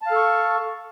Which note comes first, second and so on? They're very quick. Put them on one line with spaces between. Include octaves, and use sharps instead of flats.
A5 F5 A4 C#6